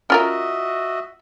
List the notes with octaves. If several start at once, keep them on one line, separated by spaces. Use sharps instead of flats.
C#4 F4 F#4 A#4 D#5 E5